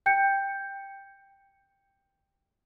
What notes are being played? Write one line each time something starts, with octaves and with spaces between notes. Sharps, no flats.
G5 G6 C#7